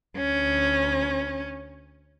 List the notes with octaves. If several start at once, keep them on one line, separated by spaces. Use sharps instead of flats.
D2 C#4